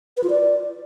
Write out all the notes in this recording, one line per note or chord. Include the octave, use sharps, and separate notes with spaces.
B4
F4
D5